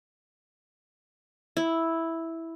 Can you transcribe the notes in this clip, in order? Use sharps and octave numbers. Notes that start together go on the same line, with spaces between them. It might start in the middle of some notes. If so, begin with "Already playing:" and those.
E4